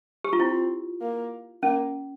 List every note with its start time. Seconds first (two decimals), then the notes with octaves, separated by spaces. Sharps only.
0.24 G4
0.33 F4
0.40 C4 E4
1.01 A#3
1.63 A#3 C#4